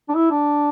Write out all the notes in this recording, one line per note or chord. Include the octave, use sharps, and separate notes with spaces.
D4
E4
D4